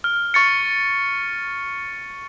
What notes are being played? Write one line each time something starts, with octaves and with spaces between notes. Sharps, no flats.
F6
C#6 A6 C#7